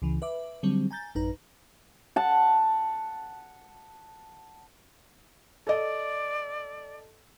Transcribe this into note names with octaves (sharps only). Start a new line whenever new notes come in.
C#2 C#3 E3
B4 E5 D6
D3 F#3 G3 C4
G#5 A#5 G6 A6
A1 F#2 D#4 B4 A#5
F#5 A5
A4 D5 D#5